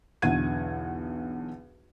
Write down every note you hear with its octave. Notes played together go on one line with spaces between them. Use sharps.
B1 E2 D3 F#5 G#6 D#7